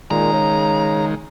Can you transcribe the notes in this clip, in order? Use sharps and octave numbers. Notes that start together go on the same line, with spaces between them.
A#2 D#3 G#3 A#5
C#3